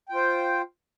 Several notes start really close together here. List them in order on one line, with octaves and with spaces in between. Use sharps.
G5 F4 C5